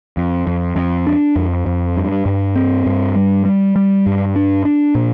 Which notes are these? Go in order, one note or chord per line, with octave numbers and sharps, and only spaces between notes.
F2
F2
F2
D4
F2
F2
G2
G2
C4
G2
G3
G3
G3
G2
D4
D4
A#2